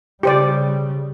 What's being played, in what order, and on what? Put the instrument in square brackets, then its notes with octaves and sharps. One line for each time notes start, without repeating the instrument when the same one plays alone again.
[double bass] C#3 G3 [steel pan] G4 C5 D5